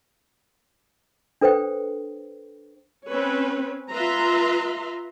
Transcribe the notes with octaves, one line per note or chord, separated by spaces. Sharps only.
D4 A4 B4 C5 G5
C4 C#4 B4 C#5
F4 B4 E5 A#5 C6